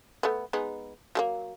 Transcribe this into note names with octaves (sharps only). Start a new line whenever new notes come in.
A3 B3
G#3 B3 D#4
F#3 A3 A#3